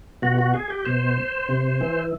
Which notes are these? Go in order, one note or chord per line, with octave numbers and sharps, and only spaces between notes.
B2 F#4
F#4
G#4
G4
B2 C5
C3
E3